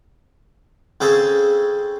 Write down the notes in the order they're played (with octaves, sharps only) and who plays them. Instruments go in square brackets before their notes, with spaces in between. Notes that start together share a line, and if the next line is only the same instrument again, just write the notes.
[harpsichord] C#3 C4 C#4 G#4 A4